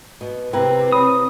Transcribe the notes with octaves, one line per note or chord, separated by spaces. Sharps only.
B2
C3 C4 E4 A#4 B4 G5
C#5 B5 D#6